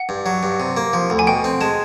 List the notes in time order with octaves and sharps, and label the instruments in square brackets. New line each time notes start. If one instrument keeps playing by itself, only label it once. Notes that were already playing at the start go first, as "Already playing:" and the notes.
Already playing: [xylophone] F#5
[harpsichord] G2
F#3
G2
C3
A#3
F3
D2
[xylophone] G#5
[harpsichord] B2 [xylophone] G5
[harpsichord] C4
[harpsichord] G#3 [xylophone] A5